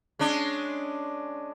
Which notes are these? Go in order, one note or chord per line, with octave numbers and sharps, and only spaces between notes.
G#3 C#4 D4